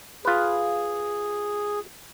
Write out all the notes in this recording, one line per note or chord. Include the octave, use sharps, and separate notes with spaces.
F4 G#4 B4